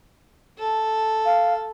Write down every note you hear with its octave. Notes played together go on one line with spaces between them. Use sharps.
A4
F5